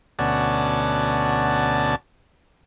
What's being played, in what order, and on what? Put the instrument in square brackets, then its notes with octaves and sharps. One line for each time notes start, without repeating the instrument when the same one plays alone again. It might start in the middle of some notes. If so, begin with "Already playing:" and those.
[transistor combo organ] D2 B2 C#4 D5 F#5 A5